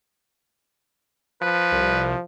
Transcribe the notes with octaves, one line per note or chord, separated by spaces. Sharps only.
F3 B4
C2